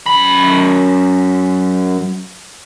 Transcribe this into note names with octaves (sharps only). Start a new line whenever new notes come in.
F#2 B5